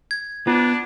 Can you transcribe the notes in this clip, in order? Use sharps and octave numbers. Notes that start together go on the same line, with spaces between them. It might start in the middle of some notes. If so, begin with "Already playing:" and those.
G#6
B3 D4 F4